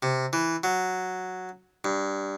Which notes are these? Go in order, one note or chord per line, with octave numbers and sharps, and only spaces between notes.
C3
E3
F#3
G2